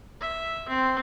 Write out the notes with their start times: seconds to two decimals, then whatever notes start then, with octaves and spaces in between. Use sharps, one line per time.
0.21 E5
0.68 C4